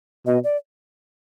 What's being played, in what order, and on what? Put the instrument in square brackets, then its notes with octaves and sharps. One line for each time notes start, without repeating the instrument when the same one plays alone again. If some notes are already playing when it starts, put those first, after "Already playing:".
[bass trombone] B2 [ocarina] D#5
[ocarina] D5